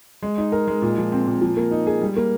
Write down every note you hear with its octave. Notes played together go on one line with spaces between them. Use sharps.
G#3
D#4
A#4
G#3
A#2
F3
C4
A#2
F3
A#3
D#4
G#4
G3
A#3